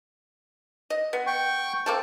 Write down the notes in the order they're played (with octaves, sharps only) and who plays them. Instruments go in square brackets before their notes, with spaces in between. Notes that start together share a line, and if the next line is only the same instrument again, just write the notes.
[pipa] D#5
B3
[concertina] G5 C#6
[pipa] A#3 C4 A4